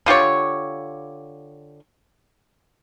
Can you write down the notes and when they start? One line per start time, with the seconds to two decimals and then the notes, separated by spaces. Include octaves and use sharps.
0.06 D3 F4 G4 C#5